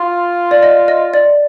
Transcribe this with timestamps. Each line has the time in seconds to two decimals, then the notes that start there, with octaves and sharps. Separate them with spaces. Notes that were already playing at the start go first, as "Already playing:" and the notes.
Already playing: F4
0.51 D5
0.63 D#5
0.88 D#5
1.14 D5